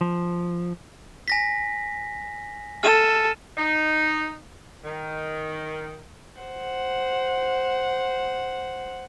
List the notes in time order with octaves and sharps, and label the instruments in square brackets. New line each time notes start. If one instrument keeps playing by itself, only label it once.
[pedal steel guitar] F3
[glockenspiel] G#5 A#6 B6
[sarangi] A4 [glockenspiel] F6 D#7 E7
[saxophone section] D#4
D#3
[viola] C5 F#5